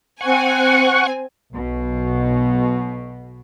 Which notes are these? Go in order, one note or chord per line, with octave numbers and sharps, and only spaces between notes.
C4 F#5 G#5 C#6
B1 B2